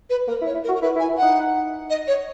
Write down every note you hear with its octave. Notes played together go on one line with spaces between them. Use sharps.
B4
A#3 A#4
E4
C#5
E4
A#4
F#4
A#4
E4 B4
E4
G#5
E4
F#5
D#4
D#5
C#5